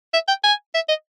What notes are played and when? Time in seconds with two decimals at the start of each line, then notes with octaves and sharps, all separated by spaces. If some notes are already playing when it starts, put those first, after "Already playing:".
0.14 E5
0.28 G5
0.44 G#5
0.75 E5
0.89 D#5